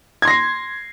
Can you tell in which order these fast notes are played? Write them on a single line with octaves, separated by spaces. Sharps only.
G#6 C6 A#6 C7